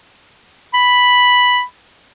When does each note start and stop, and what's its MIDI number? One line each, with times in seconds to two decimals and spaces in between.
0.74 1.63 83